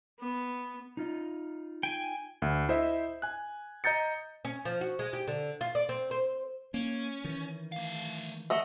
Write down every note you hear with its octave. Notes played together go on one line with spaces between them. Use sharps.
B3
D#4 F4 D#5
G5 G#5
D2
E4 C5 D#5 E5
G#5 F#6
D#5 A#5 G6 A6 C#7
C#4
F3
F#4
G#3
G4
D3
F4
D5
C4
C5
A#3 C#4
D#3 E3
A3 F5
A3 D#5 F#5